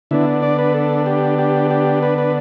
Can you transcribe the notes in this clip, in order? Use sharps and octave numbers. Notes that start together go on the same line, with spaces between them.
D3 B3 D4 E4
D5
B4
A4
G4
G4
G4
B4
B4